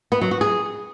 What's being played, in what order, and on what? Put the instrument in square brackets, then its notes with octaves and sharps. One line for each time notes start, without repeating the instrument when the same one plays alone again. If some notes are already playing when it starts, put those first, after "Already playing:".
[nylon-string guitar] B3
F#3
F#4
G#4